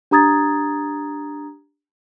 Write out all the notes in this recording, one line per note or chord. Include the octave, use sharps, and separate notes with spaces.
D4 G4 A#5 D#6 G#6 A6